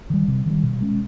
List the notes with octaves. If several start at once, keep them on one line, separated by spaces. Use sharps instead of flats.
D#3 G3
C3
D#3 G3
B2
G#3 C#4